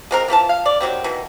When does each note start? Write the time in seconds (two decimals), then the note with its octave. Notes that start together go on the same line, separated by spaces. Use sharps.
0.11 G#3 C4 A#4
0.28 E3 F3 A4 A5
0.49 F5
0.66 D5
0.81 D#3 F#3 G3 C4
1.04 B2 D#3 E3